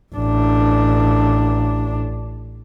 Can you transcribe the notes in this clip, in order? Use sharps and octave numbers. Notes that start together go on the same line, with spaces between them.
A1 D4